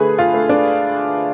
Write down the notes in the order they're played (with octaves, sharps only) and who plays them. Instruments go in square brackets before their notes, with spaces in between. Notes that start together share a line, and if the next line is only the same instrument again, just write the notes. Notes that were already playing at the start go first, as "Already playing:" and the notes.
Already playing: [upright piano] D3 A3 G#4 B4
F4
A3
D4